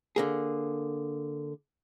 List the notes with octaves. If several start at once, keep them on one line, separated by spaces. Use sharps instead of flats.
D3 A#3 G#4